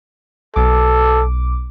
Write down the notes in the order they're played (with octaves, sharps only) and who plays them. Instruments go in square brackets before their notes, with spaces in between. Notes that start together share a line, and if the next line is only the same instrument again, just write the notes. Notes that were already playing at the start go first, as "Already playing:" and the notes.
[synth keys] B1 D6 [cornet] A4